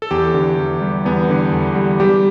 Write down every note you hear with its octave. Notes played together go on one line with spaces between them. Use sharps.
A4
E2 G4
D3
E2
G3
E2 B3
D3
E2
G3
G3 G4